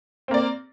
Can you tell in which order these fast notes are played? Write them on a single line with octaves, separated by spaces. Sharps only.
C4 A#3 D5